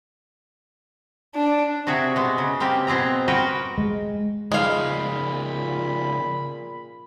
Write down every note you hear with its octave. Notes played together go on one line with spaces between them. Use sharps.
D4
C3 F#4 G#4 E5
B2 G#3
C#3
A#3 C4 G4
B2 C4 G#4 A#5
F#4 A#4 B4 G5
G#3
A#2 C#3 F3 G#3 F5 B5